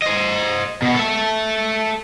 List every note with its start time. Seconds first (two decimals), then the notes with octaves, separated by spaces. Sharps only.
0.02 C5 D#5
0.82 B2 B3
0.96 A4 E5